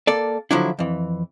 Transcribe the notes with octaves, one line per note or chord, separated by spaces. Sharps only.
A#3 A4 D5
D3 F3 F#3 D4 E4
F2 E3